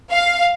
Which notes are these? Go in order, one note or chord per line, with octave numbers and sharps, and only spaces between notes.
F5